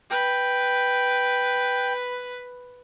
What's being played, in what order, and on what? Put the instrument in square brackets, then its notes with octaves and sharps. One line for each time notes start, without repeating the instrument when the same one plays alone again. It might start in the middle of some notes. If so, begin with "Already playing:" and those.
[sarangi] B4 [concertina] G5